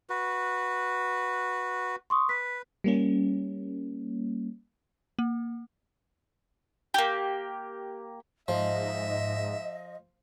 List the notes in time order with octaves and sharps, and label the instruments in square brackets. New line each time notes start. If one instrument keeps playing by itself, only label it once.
[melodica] F#4 B4
[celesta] C6 C#6 D#6
[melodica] B4 [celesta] B6
[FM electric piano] G3 A#3 C#4
[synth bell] A#3
[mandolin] A#3 G4
[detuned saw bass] G#2 [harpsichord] F3 [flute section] D#5 [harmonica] E5